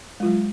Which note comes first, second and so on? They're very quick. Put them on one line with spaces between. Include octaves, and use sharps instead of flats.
G#3 F4 F#3